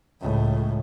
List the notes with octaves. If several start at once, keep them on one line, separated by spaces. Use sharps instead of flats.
C#2 A2